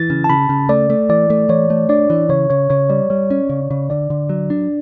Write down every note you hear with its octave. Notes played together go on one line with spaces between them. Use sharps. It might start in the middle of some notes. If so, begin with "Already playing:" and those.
Already playing: E3 A6
C#3
A5
C#3 B5
C#3
A3 D5
A3
E3 D5
A3
E3 C#5
A3
D4 D5
E3
C#3 C#5
C#3 C#5
C#3 C#5
G3 D5
G3 C#5
C#4
C#3
C#3
D3 D5
D3
F#3
D4